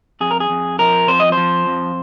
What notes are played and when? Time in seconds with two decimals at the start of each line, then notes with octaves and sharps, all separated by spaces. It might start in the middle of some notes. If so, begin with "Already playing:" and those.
0.21 F2 G#4
0.31 A#4
0.40 G#4
0.50 F2
0.79 F3 A#4
1.07 F2 C5
1.20 D#5
1.32 C5
1.37 F3
1.66 F2